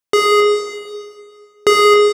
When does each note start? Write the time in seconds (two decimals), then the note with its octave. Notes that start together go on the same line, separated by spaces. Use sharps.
0.13 G#4
1.67 G#4